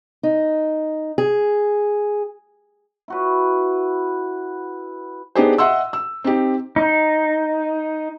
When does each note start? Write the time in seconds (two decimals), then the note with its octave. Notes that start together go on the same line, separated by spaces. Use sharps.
0.23 D#4
1.18 G#4
3.08 E4 F#4 B4
5.35 B3 D4 D#4 G4 G#4 C5
5.58 D#5 E5 F#5 C6 E6
5.93 E6
6.24 C4 D#4 G4
6.76 D#4